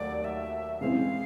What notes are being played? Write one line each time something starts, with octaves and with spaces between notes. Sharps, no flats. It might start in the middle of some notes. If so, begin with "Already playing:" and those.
Already playing: D#2 F#3 A3 D5
E5
C#3 E3 G#3 C4 F5